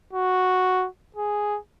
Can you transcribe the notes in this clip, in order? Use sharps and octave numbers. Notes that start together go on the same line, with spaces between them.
F#4
G#4